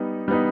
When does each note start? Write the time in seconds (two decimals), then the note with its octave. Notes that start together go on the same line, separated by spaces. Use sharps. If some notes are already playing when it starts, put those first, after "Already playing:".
Already playing: G3 B3 D#4
0.28 G3 B3 D#4